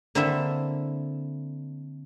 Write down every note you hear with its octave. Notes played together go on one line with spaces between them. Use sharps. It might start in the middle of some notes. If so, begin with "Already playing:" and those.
D3 A#3 C4 E4 A4 E5